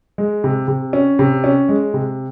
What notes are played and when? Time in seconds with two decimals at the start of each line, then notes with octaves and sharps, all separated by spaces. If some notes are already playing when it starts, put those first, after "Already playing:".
0.18 G#3
0.44 C3
0.68 C3
0.93 C#4
1.19 C3
1.44 C#4
1.69 G#3
1.94 C3